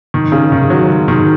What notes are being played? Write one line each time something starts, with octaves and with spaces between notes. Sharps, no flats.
D#3
C#3
D#3
F#3
G#3
D#3